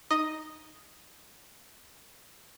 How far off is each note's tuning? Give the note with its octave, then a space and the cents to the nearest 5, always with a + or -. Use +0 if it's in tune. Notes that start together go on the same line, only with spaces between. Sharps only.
D#4 +0 D#5 +0